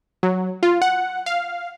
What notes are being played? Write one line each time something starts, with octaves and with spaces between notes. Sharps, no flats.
F#3
F4
F#5
F5